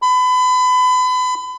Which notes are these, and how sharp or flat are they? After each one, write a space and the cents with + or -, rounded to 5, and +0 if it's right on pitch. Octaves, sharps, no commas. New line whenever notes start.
B5 +30